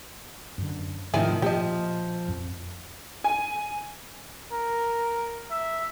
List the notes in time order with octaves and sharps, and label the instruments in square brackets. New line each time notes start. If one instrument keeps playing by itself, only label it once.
[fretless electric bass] F#2 D3
[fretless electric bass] G#2 C3 A3 [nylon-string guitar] D#3 F3 [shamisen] E4 D5 G#5
[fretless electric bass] A#2 [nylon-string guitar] F3 [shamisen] G4 D#5
[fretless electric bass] F2
[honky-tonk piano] G#5
[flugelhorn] A#4
E5